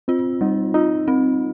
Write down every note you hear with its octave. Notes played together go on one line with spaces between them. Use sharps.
C4 F4
G3 D#4
D#4 F4
C4